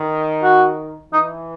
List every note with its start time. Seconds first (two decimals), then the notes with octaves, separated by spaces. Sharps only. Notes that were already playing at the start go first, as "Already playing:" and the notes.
Already playing: D#3
0.43 F#4
1.12 E3 D#4